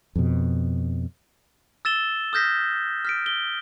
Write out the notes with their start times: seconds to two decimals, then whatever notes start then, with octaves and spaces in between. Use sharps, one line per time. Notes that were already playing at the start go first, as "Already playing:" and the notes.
0.16 F2 B2
1.85 E6 A6 E7 G7
2.33 D#6 F6 G6 A#6 B6
3.05 F6 B6 D7
3.26 G7